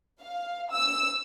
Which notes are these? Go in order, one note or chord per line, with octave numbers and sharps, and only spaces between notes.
F5
E6